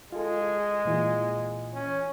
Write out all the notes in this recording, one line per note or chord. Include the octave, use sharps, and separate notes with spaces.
G#3 F4 A4
G#4
A#2 E3 F4
C#4